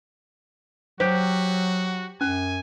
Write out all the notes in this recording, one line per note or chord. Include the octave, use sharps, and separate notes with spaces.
F#3 F#4 G4 C5
F#2 C#4 G#5